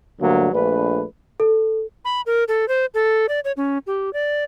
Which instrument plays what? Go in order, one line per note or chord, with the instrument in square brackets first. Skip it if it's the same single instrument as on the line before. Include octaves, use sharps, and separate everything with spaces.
[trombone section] D2 G2 D3 F#3 A#3
A#1 A3 D4 B4
[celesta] A4
[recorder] B5
A#4
A4
C5
A4
D5
C#5
C#4
G4
D5